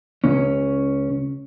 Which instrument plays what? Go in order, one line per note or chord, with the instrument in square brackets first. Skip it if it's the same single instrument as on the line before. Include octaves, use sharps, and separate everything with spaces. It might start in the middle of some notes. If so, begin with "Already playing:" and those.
[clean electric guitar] C#2 C#4